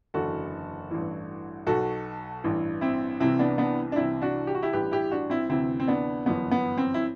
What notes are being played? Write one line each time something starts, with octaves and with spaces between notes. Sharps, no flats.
F#1 E2 D3 F#4 A4
A1 G2 E3
B1 B2 F#4 A4
A1 G2 E3
C4 E4
C2 C3 E3 C4 E4
B3 D4
B3 D4
D4
C2 C3 E3 C4 E4
D4 F#4
G4
F#4
E4 G4
A1 G2 E3 G4 B4
E4 G4
D4 F#4
C4 E4
D2 C3 E3 C4 E4
C4
B3 D4
G1 F#2 E3 B3
B3
C4
E4